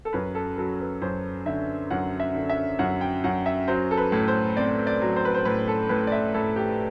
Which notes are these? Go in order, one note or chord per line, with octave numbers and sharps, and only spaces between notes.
A4
F#2 B4
A4
F#3 A4
B4
F#2 C5
D3 E5
F#2 F#5
E5
D3
E5
F#2 F#5
G5
F#2 F#5
E5
F#3 C5
A4
B4
A2
C5
C4 D5
D5
F#3
C5
B4
C5
A2 B4
A4
A2 B4
D5
E5
A2 A4
G4